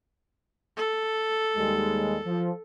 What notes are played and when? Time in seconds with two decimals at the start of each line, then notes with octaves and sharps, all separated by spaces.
0.77 A4
1.56 D#2 G3 G#3
2.26 F3